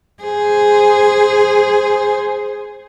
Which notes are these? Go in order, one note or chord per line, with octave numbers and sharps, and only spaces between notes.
G#4 C5